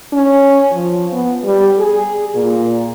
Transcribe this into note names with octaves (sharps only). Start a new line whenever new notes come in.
C#4
F3
B3
G3
G#4
A#2